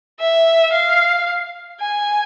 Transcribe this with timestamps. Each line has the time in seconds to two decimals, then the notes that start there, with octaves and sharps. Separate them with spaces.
0.20 E5
0.73 F5
1.80 G#5